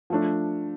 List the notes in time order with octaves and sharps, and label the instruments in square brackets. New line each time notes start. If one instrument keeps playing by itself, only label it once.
[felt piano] F3 A3 D4